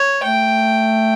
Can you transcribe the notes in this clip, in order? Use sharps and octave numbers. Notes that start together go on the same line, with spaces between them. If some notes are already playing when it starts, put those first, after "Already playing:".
Already playing: C#5
A3 G5